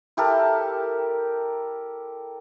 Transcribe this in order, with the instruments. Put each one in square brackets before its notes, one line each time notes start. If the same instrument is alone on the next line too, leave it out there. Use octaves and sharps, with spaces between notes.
[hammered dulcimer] E4 G4 A4 A#4